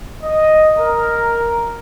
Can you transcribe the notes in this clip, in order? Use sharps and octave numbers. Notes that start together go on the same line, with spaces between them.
D#5
A#4